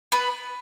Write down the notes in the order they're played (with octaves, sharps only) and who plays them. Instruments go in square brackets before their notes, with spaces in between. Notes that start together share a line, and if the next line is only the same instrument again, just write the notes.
[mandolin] B3 B4